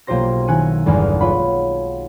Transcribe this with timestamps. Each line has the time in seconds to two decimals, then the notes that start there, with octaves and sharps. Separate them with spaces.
0.07 B1 A#3 F4 G4 C5 A#6
0.47 D#3 E4 G#5 F#6 C#7 D#7
0.86 G1 E2 G#3 G#5 F6
1.21 F4 C#5 F#5 B5